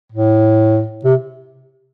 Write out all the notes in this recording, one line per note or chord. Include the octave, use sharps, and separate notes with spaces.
A2
C3